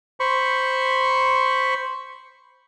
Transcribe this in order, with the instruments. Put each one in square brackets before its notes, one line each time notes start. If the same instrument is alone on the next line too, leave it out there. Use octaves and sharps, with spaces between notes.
[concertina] C5 B5 C#6